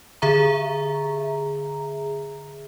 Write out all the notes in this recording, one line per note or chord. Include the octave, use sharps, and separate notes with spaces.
D3 G#4 E5 A#5